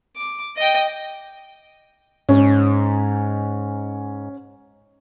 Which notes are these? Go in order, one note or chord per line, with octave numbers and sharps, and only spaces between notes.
D6
D#5 G5
G#2 C#4